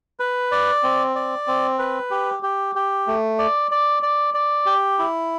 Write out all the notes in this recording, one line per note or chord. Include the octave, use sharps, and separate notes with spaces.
B4
D5
C4
D5
C4
B4
G4
G4
G4
A3
D5
D5
D5
D5
G4
E4